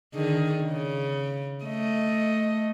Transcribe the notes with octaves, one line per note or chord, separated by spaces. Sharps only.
D3 D#3 G#4
C#3
A3 D#5